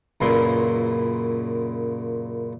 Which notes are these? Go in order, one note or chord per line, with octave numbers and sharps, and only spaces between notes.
C#2 F#2 A#2 E4 C6